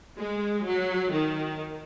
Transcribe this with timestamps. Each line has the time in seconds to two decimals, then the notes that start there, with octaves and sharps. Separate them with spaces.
0.16 G#3
0.63 F#3
1.09 D#3